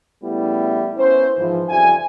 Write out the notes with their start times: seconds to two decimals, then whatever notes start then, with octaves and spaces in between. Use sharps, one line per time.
0.23 C#3 G3 A3 B3 E4
0.98 B3 C#4 E4 B4 C5
1.38 G#2 E3 F3
1.70 F2 C#3 G3 E5 G#5